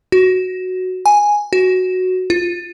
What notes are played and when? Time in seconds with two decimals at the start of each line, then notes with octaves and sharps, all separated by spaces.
0.12 F#4
1.06 G#5
1.53 F#4
2.30 F4